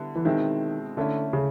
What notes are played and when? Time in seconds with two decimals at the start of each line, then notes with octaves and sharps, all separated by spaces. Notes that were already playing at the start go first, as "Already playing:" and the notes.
Already playing: D3 G3 B3 E4
0.15 E3
0.25 B2 D#3 G#3 C4 E4
0.97 D3 A3 C#4 E4
1.33 C#3